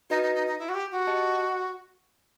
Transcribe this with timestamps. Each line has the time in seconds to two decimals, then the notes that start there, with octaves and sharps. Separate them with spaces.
0.10 D#4 F#4 B4 D#5
0.23 D#4
0.35 D#4
0.47 D#4
0.59 E4
0.69 F#4
0.74 G4
0.91 F#4
1.07 G4 D#5 A5